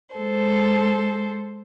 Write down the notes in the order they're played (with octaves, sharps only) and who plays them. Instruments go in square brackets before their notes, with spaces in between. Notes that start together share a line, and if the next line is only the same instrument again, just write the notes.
[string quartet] G#3 A4 C5